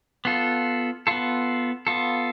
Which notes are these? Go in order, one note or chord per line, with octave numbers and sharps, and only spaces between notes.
B3 F4 A4
B3 F4 A4
B3 F4 A4